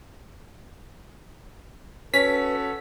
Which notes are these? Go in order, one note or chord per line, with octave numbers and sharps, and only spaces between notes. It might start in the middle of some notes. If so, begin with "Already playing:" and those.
C#4 F#4 A4 B4 B6